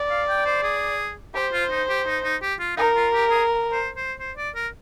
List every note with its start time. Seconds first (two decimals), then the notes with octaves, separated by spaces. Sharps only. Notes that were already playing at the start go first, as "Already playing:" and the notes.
Already playing: D5
0.10 F5
0.29 G5
0.46 C5
0.63 G#4
1.34 G4 C5
1.53 F4
1.70 D#4
1.89 G4
2.06 D#4
2.24 D#4
2.42 G4
2.60 F4
2.77 D#4 A#4
2.96 F4
3.13 G4
3.30 G#4
3.72 C5
3.97 C5
4.19 C5
4.37 D5
4.55 A#4